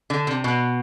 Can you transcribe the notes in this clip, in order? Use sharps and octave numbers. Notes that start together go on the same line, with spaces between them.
D3
C3
B2